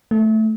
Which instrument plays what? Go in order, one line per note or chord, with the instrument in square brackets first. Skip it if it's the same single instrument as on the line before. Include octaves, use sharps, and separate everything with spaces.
[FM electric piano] A3